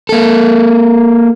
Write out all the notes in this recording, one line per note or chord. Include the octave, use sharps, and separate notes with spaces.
A#3 A4